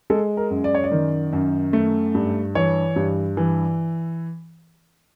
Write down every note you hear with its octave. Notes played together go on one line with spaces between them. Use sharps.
G#3 A4
A#4
F#2
D5
C#5
D5
D#3
F#2
A3
G2
E3 C#5
G2
E3